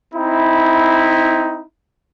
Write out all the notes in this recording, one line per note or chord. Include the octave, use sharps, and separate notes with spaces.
C4 D#4 E4